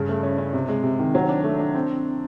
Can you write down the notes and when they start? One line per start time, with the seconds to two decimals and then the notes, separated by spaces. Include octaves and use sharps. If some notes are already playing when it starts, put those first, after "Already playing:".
Already playing: G2 C#3
0.09 A3
0.23 C#4
0.38 C#4
0.53 C3
0.69 G#3
0.84 C3
0.99 D#3
1.15 F#3
1.29 D4
1.44 A3
1.59 D4
1.75 C4